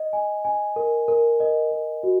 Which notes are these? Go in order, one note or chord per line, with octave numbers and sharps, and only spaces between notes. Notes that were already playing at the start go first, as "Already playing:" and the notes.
Already playing: D#5
G#5
G#5
A#4
A#4
D#5
A#4
F#4